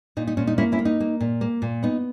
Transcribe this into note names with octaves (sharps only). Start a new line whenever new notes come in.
A#2 D#4
D#4
A#2 C#4
D#4
A#3 C#4 E4
C#4 E4
A#3
D#4
A#3
A#2
A#3
A#2
B3 D#4